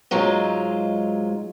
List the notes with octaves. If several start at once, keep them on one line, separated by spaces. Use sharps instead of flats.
G#2 F#3 G#3 F4